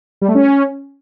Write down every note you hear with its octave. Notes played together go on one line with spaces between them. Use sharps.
G3
A3
C#4